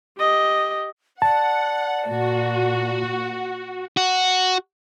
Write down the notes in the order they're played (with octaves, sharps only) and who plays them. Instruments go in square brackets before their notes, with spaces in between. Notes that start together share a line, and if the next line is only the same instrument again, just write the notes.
[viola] G4 D#5
[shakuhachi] D5 [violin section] F#5 [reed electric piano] A5
[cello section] A#2 [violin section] F#4
[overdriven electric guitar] F#4